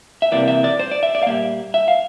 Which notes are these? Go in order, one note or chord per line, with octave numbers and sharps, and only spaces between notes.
E5
C2 C3 E3 A#3 D5
E5
D5
C5
D5
E5
D5
F5
A#2 G3 A#3 E5
E5
F5